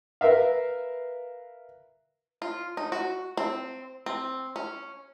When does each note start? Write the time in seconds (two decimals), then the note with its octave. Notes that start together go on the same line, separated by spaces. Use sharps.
0.21 A#4 B4 E5 F5
2.42 F4
2.77 D#4
2.92 F#4
3.37 C4
4.06 C4
4.56 C#4